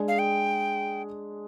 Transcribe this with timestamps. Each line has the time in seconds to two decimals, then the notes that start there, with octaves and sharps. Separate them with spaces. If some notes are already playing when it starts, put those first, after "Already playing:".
Already playing: G#3 D4 G#4
0.08 F5
0.19 G5